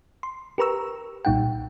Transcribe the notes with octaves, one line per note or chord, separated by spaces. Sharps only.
C6
G4 A#4 B4 A#5 C#6 E6
B1 A#2 G3 D#4 F#5 G5